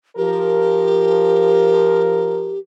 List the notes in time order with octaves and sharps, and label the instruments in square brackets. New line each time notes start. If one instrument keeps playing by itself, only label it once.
[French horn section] F3 A#4 [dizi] G4